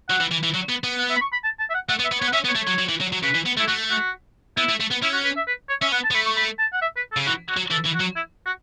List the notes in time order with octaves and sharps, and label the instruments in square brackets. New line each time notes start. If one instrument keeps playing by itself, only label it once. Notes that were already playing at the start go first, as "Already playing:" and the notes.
[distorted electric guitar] F#3 [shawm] F#5
[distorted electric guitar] E3
E3
E3
F#3
B3
B3
[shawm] F#5
E5
B5
C#6
B5
A5
A5
E5
F#5
[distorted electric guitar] A3 [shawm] F#5
[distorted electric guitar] B3
[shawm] E5
[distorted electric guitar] B3
[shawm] C#5
[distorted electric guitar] B3
[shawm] F#5
[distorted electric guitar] C#4 [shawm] E5
[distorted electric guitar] B3
[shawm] C#5
[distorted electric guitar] A3
[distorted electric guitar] F#3 [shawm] C#5
[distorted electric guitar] F#3
E3
F#3
F#3
[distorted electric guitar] C#3 [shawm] B4
[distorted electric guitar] E3
B3
[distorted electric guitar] A3 [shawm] E4
[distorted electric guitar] A3 [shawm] F#4
[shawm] F#4
[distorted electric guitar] B3 [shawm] E4
[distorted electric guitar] A3
A3
B3
[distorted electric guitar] C#4 [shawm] E4
[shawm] F#4
B4
E5
B4
C#5
[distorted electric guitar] C#4 [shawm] E5
[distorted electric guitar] B3 [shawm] F#5
[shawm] A5
[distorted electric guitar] B3
[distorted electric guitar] A3 [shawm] B5
[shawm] C#6
B5
A5
F#5
E5
B4
A4
[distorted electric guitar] C#3
[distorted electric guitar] E3 [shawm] F#4
[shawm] F#4
[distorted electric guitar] F#3
[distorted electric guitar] E3 [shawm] A4
[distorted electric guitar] E3
[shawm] F#4
[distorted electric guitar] F#3
[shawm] E4
F#4